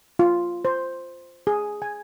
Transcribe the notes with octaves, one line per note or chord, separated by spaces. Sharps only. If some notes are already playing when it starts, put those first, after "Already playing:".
F4
C5
G#4
G#5